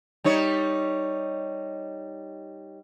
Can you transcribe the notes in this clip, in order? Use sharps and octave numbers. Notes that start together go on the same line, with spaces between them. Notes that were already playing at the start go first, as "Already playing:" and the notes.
G3 D#4 C#5